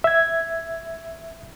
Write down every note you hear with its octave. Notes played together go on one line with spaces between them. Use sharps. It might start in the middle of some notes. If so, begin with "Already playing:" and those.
E5 G#6